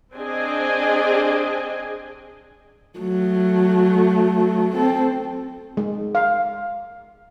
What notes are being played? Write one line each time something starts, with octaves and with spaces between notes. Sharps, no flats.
C4 D4 G#4 D#5 G#5
F#3 A3
C4 A4
G#3
F5